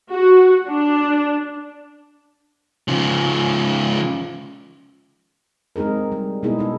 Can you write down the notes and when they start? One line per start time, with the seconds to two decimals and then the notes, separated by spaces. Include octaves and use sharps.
0.12 F#4
0.68 D4
2.88 C#3 F3
5.76 G#3 C4 D#4 G#4 A#4
6.12 G3
6.43 B2 G#3 B3 D#4 E4 G#4
6.59 D#4 A4